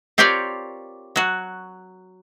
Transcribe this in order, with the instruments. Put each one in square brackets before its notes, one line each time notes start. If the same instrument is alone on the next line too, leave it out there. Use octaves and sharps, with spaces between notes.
[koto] C4 F4 G4 A#4 C#5 D5
F#3 F#4